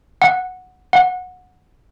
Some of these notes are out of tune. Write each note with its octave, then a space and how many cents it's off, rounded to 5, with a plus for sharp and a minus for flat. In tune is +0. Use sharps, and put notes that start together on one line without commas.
F#5 -5
F#5 -20